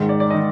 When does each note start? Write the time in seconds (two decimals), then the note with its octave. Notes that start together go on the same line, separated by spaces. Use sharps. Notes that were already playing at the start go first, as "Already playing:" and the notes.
Already playing: G#2 D#3
0.09 D5
0.20 D5
0.30 D#5
0.34 D#3